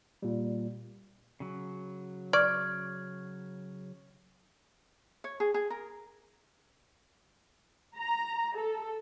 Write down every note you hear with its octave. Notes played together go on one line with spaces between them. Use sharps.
A#2 G3
C#3 F#3
D5 C#6 F6 G#6
C#5
G#4
G#4
A#4
A#5
A4